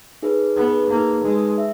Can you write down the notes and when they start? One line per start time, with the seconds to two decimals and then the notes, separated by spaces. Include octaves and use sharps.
0.22 D#4 G#4 B4
0.56 B3 D#4 G#4 B4
0.90 A#3 D#4 G#4 B4
1.24 G#3 D#4 G#4 B4
1.58 E5